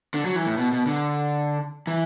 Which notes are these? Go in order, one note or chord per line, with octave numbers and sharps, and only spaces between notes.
D3
F#3
E3
A2
B2
B2
D3
E3